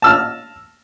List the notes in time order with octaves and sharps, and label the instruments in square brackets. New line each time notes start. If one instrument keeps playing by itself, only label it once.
[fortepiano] A5 E6 F6